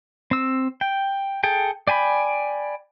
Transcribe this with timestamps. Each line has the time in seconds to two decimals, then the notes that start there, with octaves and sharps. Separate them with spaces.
0.31 C4 E6
0.81 G5
1.44 G#4 A4 G5
1.88 D5 G5 G#5 B5